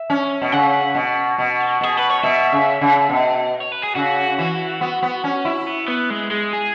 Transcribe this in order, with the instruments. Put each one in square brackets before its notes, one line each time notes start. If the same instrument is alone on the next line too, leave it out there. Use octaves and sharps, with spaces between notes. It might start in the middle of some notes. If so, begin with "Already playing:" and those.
Already playing: [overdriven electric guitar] E5
[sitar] C#4
B2
[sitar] C#3 [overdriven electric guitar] F#5
[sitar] B2
B2
[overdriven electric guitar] F#4
[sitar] B2 [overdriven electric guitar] G#4
[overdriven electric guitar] B4
C#5
[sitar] B2 [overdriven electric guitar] E5
[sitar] C#3
C#3
B2
[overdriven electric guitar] C#5
B4
G#4
[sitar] C#3 [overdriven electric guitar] F#4
[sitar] E3
B3
B3
C#4
E4
[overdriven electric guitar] B3
B3
G#3
G#3
G#4